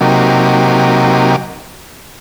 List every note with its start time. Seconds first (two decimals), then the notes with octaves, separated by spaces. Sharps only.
0.01 C3 F#3 A#3 D#4 G4